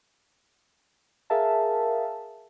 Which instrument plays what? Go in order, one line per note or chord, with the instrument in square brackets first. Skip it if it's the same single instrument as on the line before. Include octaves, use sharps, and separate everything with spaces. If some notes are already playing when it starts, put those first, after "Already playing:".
[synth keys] G#4 A#4 E5 F5 A5